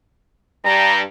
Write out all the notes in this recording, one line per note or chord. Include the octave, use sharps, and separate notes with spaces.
G2 G3 A#5